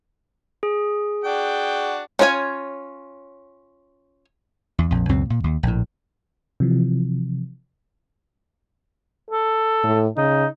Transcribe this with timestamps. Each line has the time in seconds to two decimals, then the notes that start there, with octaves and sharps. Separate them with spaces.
0.63 G#4
1.24 D4 F#4 G5
2.19 C#4 F4 C#5 D5 G#5
4.78 E2
4.91 A#1 F2
5.09 C#2 F#2 B2 C4
5.30 A#2
5.44 D#2
5.63 A#1 A2
6.60 C3 E3 F3
9.31 A4
9.83 A2
10.17 C#3 D#4